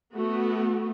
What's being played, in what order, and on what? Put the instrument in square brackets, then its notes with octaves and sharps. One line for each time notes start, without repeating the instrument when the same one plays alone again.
[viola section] A3 B3 F#4